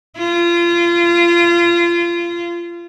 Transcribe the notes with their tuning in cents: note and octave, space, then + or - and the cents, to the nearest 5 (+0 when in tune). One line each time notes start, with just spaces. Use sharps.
F4 -30